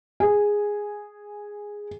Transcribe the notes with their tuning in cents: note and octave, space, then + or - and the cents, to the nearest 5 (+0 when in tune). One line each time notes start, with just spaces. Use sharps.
G#4 -5 G#5 +0